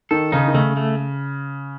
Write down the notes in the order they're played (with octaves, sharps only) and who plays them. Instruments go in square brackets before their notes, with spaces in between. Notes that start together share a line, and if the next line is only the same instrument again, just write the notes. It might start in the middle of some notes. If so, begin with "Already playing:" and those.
[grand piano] D#3 [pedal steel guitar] A4
[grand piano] C#3 [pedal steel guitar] D#4
[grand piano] D#3
[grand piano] C#3 [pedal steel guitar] A3
[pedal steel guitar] A3